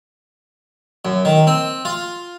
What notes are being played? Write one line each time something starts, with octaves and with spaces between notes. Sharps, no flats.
F#2
D#3
C4
F4